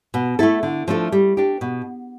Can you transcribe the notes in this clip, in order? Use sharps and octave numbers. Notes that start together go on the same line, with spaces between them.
B2
A3 E4 A4
D3
F3 A3 D4 A4
G3
D4 G4
B2